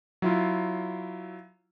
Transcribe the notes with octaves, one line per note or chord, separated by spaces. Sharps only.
F#3 E4 F4